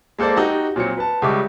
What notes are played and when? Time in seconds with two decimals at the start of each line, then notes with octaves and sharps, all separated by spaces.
0.19 G#3 A#3 A4 C5 D5
0.36 D#4 F#4 G4
0.76 A#2 F#3 C4 C#7
0.98 B4 A5
1.22 C#2 C#3 G3 E5 C#6 D6